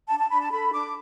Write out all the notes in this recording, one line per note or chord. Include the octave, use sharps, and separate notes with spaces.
D4 A5
A5
D4 B5
A5
A4 B5
D4 D6